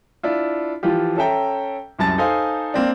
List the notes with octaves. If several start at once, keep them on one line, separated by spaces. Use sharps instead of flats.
D4 E4 F4
E3 F3 F4 G4
C#4 A4 E5 G5 A#5
C2 F#2 A5 A6
D#4 A4 C5 F5 G#5
A#3 C4 D4